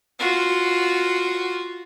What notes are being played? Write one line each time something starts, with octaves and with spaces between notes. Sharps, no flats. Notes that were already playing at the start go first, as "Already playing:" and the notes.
F4 F#4